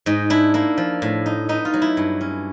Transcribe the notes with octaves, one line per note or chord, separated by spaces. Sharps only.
G#2 D#4
D4 E4
A#3 E4
F3
A2
D#4
B3 D#4
F4
F#3
E4
G2
C#4